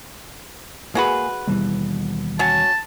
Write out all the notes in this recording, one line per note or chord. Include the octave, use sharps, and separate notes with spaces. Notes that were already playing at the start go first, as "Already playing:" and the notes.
G#3 A#3 F#4 G#4 B4
D#2 B2 E3 G3
F#3 C#4 A5